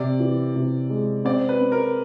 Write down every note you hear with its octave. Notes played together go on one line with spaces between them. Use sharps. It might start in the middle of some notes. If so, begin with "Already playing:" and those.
Already playing: C3 D5
E3
C3
G#3
C4 D5
B4
C4
A#4